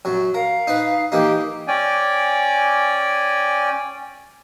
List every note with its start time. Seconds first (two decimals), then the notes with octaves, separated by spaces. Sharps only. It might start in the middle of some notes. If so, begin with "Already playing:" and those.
0.05 F#2 F#3
0.34 A#4 F5
0.67 D#4 B4
1.12 E3 A#3 D#4 G4
1.68 C#4 D5 G5 G#5